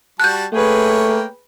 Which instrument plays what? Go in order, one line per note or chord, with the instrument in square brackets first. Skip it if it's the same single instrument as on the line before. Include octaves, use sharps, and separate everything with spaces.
[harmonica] G3 F#4 A5 [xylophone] F#6 G6
[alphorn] A3 [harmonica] A#3 C#5 G5 [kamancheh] G#4 B4